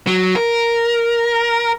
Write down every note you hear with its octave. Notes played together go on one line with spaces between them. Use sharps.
F#3
A#4